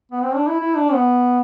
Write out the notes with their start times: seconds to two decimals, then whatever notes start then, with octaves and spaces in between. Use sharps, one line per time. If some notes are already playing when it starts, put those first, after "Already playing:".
0.11 B3
0.23 C4
0.35 D4
0.47 E4
0.60 E4
0.76 D4
0.93 B3